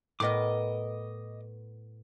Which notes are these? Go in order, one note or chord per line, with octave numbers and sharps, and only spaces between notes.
A2 B3 A#4 D#5 D6